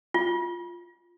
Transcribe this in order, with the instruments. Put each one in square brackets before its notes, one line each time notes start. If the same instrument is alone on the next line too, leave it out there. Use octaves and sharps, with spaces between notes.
[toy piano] F4